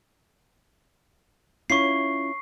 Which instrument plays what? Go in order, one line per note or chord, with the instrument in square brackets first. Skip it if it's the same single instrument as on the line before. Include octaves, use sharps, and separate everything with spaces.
[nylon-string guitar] C#4 E4 F4 [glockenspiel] C#6 C7